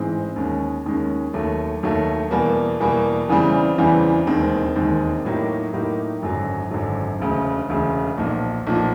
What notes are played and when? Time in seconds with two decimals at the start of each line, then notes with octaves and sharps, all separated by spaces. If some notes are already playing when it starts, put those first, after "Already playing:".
Already playing: A1 G#2 E3 G#3 C4
0.36 D#2 D#3 G#3 C#4
0.86 D#2 D#3 G#3 C#4
1.34 D#2 D#3 F#3 A3
1.83 D#2 D#3 F#3 A3
2.31 E2 B2 G3 A#3
2.80 E2 B2 G3 A#3
3.29 E2 C#3 E3 G3 C4
3.78 E2 C#3 E3 G3 C4
4.27 E1 D#2 D#3 G#3 C4
4.75 E1 D#2 D#3 G#3 C4
5.25 A2 F#3 A#3 D#4 G4
5.73 A2 F#3 A#3 D#4 G4
6.22 G#1 F#2 D3 F#3
6.70 G#1 F#2 D3 F#3
7.19 E1 D2 C#3
7.69 E1 D2 C#3
8.18 B1 A#2 F3
8.67 B1 A#2 F3